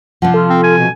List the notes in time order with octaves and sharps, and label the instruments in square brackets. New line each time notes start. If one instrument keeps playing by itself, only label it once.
[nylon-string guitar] C3 F3 [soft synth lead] F#5
[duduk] F4 [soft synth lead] A4
[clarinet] C4
G#5
[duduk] B2